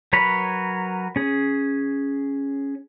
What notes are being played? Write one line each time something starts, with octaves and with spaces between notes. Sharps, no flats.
F#3 A#4 B4 C#5 B5
C#4 G#4